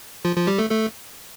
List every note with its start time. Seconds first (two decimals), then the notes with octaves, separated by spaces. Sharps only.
0.25 F3 F4
0.37 F3 F4
0.47 G3 G4
0.58 A3 A4
0.70 A3 A4